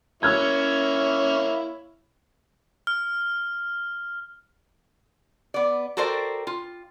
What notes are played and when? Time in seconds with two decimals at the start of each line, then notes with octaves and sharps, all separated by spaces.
0.23 A#3 C#4 E4 C#5 E5 E6 F6 G#6
2.87 F6
5.54 B3 D5
5.97 F#4 A4 A#4 C5 D5 G5
6.47 F4